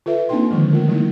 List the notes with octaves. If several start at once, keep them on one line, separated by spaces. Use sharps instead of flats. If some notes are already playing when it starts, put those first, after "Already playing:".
F4 A4 B4 E5
A#3 C4 D4 D#4 G5 C6
D3 D#3 F3 G#3
A3 B3 F4 A#4
E3 F#3 A3 A#3 D#4 E4